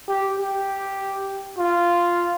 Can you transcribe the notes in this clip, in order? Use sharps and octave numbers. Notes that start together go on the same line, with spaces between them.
G4
G4
F4